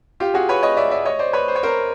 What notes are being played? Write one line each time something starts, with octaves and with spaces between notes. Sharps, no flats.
F4 G4
F#4 G#4
B4 C#5
C#5 D#5
D5 E5
D5 E5
C#5 D#5
C5 D5
B4 C#5
C5
C#5
A#4 C5